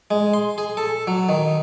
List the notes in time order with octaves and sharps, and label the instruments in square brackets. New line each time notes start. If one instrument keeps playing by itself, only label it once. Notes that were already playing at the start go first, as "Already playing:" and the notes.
[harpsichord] G#3
C6
G#4
A4
F#3
D#3